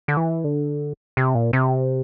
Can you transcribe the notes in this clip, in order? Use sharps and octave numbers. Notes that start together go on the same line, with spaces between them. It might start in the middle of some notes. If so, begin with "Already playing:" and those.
D3
E3
D3
C3
A#2
C3